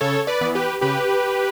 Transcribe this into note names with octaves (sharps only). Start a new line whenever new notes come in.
C#3 A4 C#5
B4 D5
E3 B3
G4 B4
C#3 G4 B4